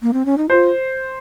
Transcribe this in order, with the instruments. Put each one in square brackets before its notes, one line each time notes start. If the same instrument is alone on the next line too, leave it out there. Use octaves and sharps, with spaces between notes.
[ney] A#3
C4
C#4
D#4
[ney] F4 [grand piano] C5